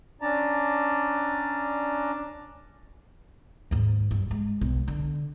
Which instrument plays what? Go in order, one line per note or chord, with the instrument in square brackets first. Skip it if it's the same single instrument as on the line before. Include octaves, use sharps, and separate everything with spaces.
[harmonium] C#4 D4 D5 A5 A#5
[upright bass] D#2 G#2
G2
G#3
B1
D3